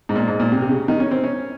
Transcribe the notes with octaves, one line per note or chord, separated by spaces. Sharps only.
G#2
A#2
G#2
A#2
C3
C3
C#3
D#3
C#4
C4
C#4